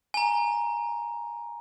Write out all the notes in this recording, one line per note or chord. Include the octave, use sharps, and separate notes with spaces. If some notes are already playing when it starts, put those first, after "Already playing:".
G#5 A#5